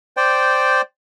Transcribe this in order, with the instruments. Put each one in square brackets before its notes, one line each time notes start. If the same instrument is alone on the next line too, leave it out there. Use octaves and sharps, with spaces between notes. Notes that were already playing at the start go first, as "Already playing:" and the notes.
[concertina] C5 D5 G5